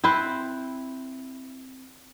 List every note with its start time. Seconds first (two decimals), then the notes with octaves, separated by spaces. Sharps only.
0.04 C4 E4 B4 C5